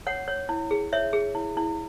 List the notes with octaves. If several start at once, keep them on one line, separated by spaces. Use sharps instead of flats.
C#5 F#5
C#5
E4
G#4
C#5 E5
G#4
E4
E4